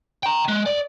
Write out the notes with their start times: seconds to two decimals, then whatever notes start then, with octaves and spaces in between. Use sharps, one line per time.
0.23 G5 A#5
0.48 G#3
0.66 D5